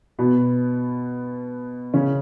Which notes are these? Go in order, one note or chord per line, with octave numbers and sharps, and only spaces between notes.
B2 B3
C#3 C#4